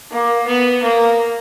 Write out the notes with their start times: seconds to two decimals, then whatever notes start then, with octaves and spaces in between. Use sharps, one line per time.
0.11 A#3
0.47 B3
0.82 A#3